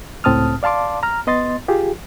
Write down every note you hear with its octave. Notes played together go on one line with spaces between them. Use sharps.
C#2 A2 C4 A5 D#6 F6
D5 F5 A5 C6 D6
A#5 F6
B3 D#5 C6 A6
F4 G4 G#4